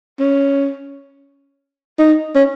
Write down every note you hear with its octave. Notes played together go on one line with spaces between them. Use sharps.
C#4
D#4
C#4